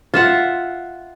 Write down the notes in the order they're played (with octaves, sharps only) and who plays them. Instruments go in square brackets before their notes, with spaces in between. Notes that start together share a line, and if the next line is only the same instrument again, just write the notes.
[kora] F4 E5 F#5